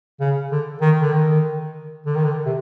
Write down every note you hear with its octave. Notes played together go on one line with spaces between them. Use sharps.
C#3
D3
D#3
D3
D#3
D3
D#3
D3
C3